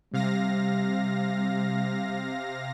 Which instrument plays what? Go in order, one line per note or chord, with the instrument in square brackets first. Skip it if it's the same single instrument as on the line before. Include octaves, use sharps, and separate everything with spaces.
[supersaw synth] C3 F5 A#6 [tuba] G3